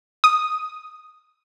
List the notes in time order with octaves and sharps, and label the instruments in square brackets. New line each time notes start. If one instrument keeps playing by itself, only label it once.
[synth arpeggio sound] D#6